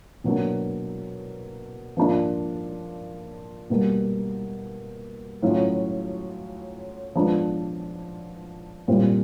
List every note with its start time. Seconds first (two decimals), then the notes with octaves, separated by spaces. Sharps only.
0.24 B2 F#3 A#3 D4
1.97 F3 A#3 D4 F4
3.70 B2 G3 A#3
5.42 A2 F#3 A3 C#4 F4
7.15 F3 G#3 B3 D4
8.88 A#2 G3 C4 E4